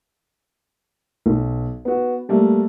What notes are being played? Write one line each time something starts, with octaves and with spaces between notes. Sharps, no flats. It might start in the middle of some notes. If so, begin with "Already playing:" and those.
B1
B3 F#4
G3 A3 A#3